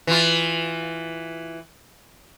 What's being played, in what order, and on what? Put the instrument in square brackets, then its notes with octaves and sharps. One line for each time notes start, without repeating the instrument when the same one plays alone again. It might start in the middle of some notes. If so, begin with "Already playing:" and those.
[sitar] E3 F4